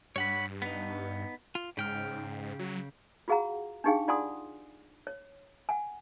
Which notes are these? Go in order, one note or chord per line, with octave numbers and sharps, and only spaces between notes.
G2 C#5 F#5 B5
B3 D#4
F4
G#2 C#3 G5 F6
F#3
F4 F#4 G#4 F5 F#5 A#5
D4 D#4 G4 G#4 F5 G5
F4 D5 F#5 G#5 C6 D#6
C#5
F#5 G#5